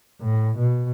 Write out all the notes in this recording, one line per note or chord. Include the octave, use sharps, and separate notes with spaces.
A2
B2